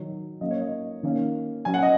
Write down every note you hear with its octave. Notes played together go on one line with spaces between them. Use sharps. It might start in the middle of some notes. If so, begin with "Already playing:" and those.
Already playing: D#3 F#3 D#4
F#3 A#3 C#4 D#5
C#5
D#5
D#3 A#3 C#4
F#3 C#4 G#5
F#5
D#5